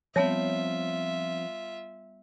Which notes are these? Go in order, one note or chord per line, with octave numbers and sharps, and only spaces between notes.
F3 G3 B3 C4 F4 C#5 E5 A5